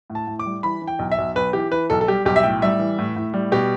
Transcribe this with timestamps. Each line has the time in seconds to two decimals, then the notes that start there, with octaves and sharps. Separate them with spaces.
0.10 A2
0.15 A5
0.27 A2
0.39 D6
0.46 G3
0.63 E3 B5
0.82 E3
0.87 G5
0.99 B1
1.12 E5
1.18 B1
1.35 B1 B4
1.53 E3 G4
1.71 E3 B4
1.90 B1 A4
2.01 A4
2.08 G3 G4
2.25 B1 G4
2.36 E5
2.43 A2 G5
2.62 G3 E5
2.79 E3
2.98 A2
3.16 A2
3.34 G3
3.52 B2 G4